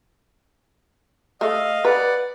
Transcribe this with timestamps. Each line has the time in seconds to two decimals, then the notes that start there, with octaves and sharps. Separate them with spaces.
1.41 A3 D#5 F5
1.85 B4 D5 F#5